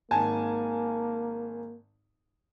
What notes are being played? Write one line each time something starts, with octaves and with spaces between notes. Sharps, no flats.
G#1 A#3 G#5 A5